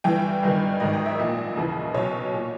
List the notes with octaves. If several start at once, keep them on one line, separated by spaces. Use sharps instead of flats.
G1 G2 E3 G5
G1 G2 D#3
G#1 G#2 D#3 D#5
G5
E5
A#1 A#2 D#5
D#2 C#3 E3
B1 B2 C#5
A#2